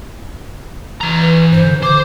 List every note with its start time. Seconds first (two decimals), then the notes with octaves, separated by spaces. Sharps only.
1.01 E3 A#5
1.22 B4
1.52 G2 C5
1.64 D3
1.83 D3 C5 D6